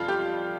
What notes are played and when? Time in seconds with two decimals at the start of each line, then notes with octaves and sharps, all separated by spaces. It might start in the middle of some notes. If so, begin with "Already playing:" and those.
Already playing: F2 G3 F4
0.08 G4